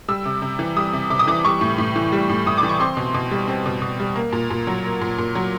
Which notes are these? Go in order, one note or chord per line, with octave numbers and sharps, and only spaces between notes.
G3 E6
C3
C3
E3
G3 D#6
C3
C3 D6
D#6
E3 D6
G3 C#6
A2
A2
E3
G3
A2
A2 D#6
D6
E3
C#6
C4 C6
B2
B2
G3
C4
B2
B2
G3
A#3
A#2
A#2
F#3
A#3
A#2
A#2
F#3